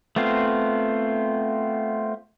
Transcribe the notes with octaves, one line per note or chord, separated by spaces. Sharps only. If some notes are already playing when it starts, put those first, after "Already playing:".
A3 B3 C4 F4